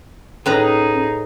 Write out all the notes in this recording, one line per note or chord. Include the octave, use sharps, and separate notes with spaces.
A2 C#4 D#4 G#4 B4 A#5